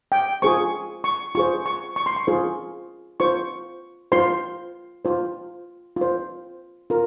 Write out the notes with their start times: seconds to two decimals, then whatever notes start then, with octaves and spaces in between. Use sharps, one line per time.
0.12 G5
0.42 F4 G#4 C5 C#6
1.04 C#6
1.35 F4 G#4 C5 C#6
1.66 C#6
1.96 C#6
2.06 C6
2.16 C#6
2.27 F4 G#4 C5
3.20 F4 C5 C#6
4.12 F4 C5 C6
5.05 F4 C5
5.96 F4 C5
6.90 F4 A#4